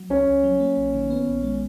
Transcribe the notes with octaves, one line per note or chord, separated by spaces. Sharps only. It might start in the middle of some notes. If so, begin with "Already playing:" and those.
Already playing: F#3
C#2 C#4
C#2
F#3
A#3
A#1
D#3
B3
A#1
G#3